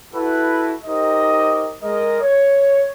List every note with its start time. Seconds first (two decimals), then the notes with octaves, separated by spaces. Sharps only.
0.13 E4 F#4 A4 B4
0.84 D#4 G4 A#4 C5 D#5
1.82 G#3 A#4 D#5
2.21 C#5